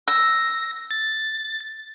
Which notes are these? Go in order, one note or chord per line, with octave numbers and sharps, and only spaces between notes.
E6 A#6
A6